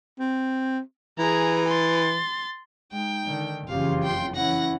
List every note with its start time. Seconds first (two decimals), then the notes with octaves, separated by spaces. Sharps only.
0.19 C4
1.19 E3 G#4 A#5
1.68 C6 A6
2.92 G#3 D#4 G5
3.25 D3 D#3
3.68 F#1 F2 C#3 E3 F4 G4 F5
4.03 G5 C6
4.36 E3 C#4 E4 F#5 A#6